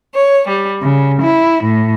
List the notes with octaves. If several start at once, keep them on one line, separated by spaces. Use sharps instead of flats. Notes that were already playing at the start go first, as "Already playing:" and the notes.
C#5
G3
C#3
E4
A2